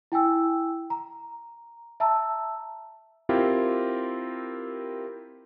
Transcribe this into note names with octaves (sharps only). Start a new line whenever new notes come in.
E4 G5 G#5 E6
A#5
E5 A5 A#5 E6
C4 E4 F4 G4 A#4